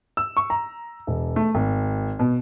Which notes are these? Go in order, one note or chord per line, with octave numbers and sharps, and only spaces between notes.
E6
C#6
A#5
E1
A3
G#1
B2